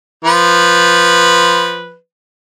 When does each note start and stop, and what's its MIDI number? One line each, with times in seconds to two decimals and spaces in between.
0.24 1.94 53
0.24 1.94 71